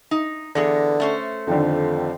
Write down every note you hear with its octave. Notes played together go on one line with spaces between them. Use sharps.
D#4
D3 E3 B3 G#4 A#6
A3 C#4 C5
F2 D3 D#3 C4